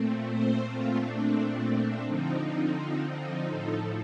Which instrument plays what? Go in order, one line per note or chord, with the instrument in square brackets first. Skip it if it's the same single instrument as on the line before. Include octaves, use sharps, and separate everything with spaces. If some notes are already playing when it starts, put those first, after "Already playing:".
Already playing: [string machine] A#2 A3 C4
C5
A#2 A3 C4 F4
D4
D4
D3 F3 C4 D#4
D#4
A2 F3 A3